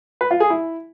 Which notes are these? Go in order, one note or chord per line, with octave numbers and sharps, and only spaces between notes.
B4
F4
G#4
E4